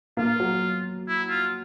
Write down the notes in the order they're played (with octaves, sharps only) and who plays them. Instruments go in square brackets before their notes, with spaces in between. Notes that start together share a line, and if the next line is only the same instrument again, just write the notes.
[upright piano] A#3 [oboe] F4
[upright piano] F#3
[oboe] E4
F4